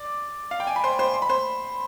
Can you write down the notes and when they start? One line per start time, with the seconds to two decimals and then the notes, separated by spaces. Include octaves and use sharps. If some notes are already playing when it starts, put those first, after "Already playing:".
Already playing: D5 D6
0.51 F5
0.60 G5
0.67 G#5
0.76 B5
0.84 C5 C6
0.99 C5 C6
1.14 C6
1.22 B5
1.29 C5 C6